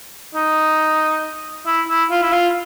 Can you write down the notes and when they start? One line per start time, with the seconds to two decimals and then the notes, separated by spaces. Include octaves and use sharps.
0.35 D#4
1.67 E4
1.89 E4
2.11 F4
2.23 E4
2.33 F4